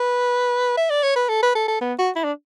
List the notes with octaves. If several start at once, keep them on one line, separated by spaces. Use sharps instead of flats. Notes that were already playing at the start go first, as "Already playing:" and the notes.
Already playing: B4
E5
D5
C#5
B4
A4
B4
A4
A4
B3
F#4
E4
D4